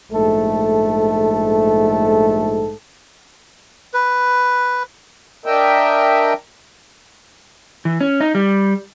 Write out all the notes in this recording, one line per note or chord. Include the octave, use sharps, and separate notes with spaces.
A#1 G#2 A3 A4
B4
D4 A#4 D#5 E5 G5
E3
C#4
D#4
G3